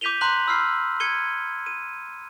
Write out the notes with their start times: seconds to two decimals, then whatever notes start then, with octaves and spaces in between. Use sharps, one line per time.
0.01 D6 G6 B6 D#7 F7 G7
0.21 A#5 C6 D6 F#6 B6 F#7
0.47 B5 E6 F6 C7
1.00 G#6 C#7 D#7 G7
1.66 D#7